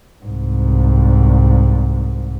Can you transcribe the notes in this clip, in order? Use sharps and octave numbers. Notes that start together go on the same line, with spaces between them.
C2 G#2